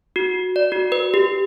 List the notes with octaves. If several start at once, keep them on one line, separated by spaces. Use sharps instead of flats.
F#4
D5
F#4
B4
G4